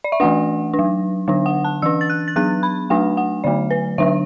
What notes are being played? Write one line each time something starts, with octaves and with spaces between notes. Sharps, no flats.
D5
E5
E3 A3 D4 F#5
D4
F#3
D3 F#3 D4
F#5
A5
E3 D4 E6
A6
F#6
A6
F#3 B3 D4 F#6
B5
F#3 A3 D4 F#5
F#5
D3 F#3 A3 D5
B4
D3 F#3 D4 E5